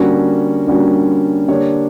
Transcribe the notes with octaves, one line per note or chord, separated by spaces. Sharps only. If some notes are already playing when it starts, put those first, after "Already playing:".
Already playing: D3 G3 A#3 C#4 F#4
D3 G3 A#3 C#4 F#4
D3 A#3 D4 G4 C#5